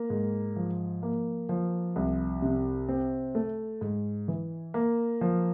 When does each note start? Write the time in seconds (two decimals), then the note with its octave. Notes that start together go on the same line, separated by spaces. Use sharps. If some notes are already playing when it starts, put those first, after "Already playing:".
Already playing: A#3
0.10 G#2
0.56 F3
1.03 A#3
1.49 F3
1.96 C2
2.42 C3
2.89 C4
3.35 A3
3.81 G#2
4.28 E3
4.74 A#3
5.21 F3